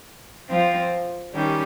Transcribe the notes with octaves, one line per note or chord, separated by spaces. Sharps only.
F3 C4 F4
D#3 G3 C#4 G4